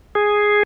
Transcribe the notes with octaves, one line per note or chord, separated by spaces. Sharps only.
G#4